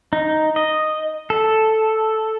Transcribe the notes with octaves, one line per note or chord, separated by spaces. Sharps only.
D#4
D#5
A4